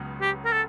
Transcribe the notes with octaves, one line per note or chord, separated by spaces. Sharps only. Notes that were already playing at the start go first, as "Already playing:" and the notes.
Already playing: C#2 C#3 F#3 B3
G4
A#4
A4